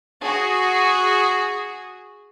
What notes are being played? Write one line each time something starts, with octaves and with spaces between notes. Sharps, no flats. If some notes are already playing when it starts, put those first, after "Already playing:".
F#4 G#4